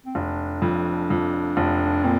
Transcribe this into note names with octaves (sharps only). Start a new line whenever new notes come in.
C4
F1 D4
F2
F2
F1
A#2 C4